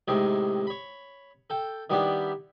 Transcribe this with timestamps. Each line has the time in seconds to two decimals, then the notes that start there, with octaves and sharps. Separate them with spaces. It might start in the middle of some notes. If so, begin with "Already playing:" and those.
0.08 A2 C3 D#3 G#3
0.67 C#5 B5
1.50 A4 G5
1.90 D#3 G3 B3 D4 E4 G4